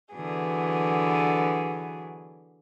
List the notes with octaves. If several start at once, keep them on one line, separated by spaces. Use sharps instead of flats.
D3 E3 F#3 B3 G#4